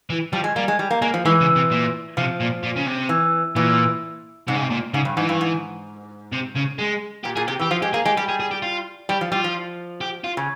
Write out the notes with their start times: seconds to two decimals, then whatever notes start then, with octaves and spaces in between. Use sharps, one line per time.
0.10 E3
0.33 F3 G3
0.44 G#3
0.56 G3 A#3
0.68 G#3
0.79 G3
0.90 A#3
1.02 G#3 A#3
1.14 F3
1.25 E3 G#3
1.40 C#3
1.56 C3
1.71 A#2
2.17 C3 F3
2.40 A#2
2.63 A#2
2.76 C#3
2.87 C3
3.09 E3
3.56 A#2 E3
4.48 G#2 C3
4.55 C#3
4.62 C3
4.71 A#2
4.94 G#2 C#3
5.05 G2
5.17 G#2 E3
5.29 G2
5.41 G#2
6.32 C3
6.55 C#3
6.78 G#3
7.24 A#2 G4
7.36 A#2 G#4
7.48 C3 G4
7.59 E3 G4
7.71 F3 F4
7.82 G#3 G4
7.93 A#3 G#4
8.05 G#3 G4
8.17 G3 G4
8.29 G#4
8.40 G#4
8.51 G4
8.63 F4
9.09 G3 G4
9.21 F3
9.32 G3 F4
9.44 F3
10.01 G4
10.24 F4
10.37 C#3